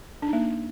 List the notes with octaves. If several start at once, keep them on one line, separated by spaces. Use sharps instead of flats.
D4
D#4
A#3